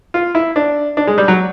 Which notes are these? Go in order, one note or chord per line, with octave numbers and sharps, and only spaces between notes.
F4
E4
D4
D4
G#3
G3
F#3